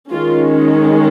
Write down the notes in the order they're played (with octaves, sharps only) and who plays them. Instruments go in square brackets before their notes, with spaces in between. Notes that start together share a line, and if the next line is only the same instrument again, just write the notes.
[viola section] D#3 G#3 C#4 F4